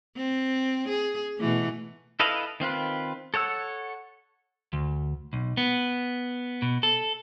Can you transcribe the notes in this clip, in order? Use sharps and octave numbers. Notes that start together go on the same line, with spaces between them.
C4
G#4
B2 E3 A3
E4 A4 B4 D#5 F5
D#3 C4 F4 B4
A4 C#5 F#5 E6
D2
B1
B3
B2
A4